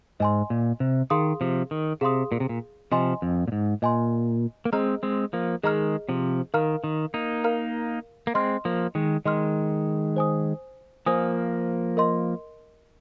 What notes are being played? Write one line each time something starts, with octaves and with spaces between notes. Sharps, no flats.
G#2 D#5 G#5 C6
A#2
C3
D#3 G#4 F5 C6 D#6
C3 F3
D#3
C3 G#4 F5 C6 D#6
A#2
C3
A#2
C3 F3 D#5 G#5 C6
F2
A#2
G#2
A#2 D#5 G#5 C6
A#3
G#3 C4 G#4 D#5 A#5 F6
G#3 C4
F3 A#3
D#3 G#3 G#4 D#5 A#5 F6
C3 F3
D#3 A#4 F5 A#5 F6
D#3
A#3 D#4
A#4 F5 A#5 F6
A#3
G#3 C4 D#5 C6 F6
F3 A#3
D#3 G#3
D#3 G#3 D#5 C6 F6
C5 G#5 D#6
F3 A#3 C5 G#5 D#6
A#4 D#5 C6